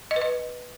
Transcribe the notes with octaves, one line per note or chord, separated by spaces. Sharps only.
D#5
B4
D#5